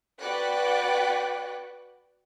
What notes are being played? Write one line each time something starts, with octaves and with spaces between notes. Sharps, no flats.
F#4 B4 D5 F#5 G5 F#6